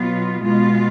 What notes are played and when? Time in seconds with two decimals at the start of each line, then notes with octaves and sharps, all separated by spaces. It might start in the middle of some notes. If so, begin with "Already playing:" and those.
Already playing: B2 F#3 B3 F4
0.42 B2 G#3 B3 F4